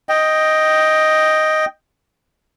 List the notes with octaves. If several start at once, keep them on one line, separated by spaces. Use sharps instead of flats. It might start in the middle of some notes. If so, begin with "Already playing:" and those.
D#5 G5